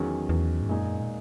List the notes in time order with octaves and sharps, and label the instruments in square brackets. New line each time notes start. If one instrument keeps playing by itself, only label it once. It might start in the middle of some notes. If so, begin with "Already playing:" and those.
Already playing: [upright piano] E2 D#3 F#3 C#4 G#4
[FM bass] E2
G#2
[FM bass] F#2 [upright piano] A#2 G#3 D#4 G#4
[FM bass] A#2